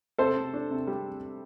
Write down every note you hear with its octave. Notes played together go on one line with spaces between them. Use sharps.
C3 A4 C5
C3
D4
C3
G3